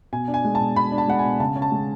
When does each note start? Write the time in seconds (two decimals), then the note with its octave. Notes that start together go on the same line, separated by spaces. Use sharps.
0.13 B2 G#5
0.28 D4
0.34 G#5
0.45 G#3
0.55 A5
0.60 B2
0.76 B2 B5
0.92 D4
0.98 A5
1.08 G#3 F#5
1.19 B2 G#5
1.40 C#3 A5
1.56 C#4
1.62 A5
1.72 G#3